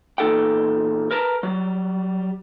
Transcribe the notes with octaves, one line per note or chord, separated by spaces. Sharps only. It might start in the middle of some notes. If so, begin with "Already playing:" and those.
E2 A#2 D#4 A4 F#5 G5
A#4 B4 A5 A#5
F#3 G3